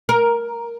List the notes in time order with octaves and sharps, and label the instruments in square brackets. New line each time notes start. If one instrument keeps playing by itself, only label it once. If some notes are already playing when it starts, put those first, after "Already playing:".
[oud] A#4